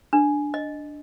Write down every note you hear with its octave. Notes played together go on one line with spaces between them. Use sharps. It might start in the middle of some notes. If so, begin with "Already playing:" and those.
D4
D#5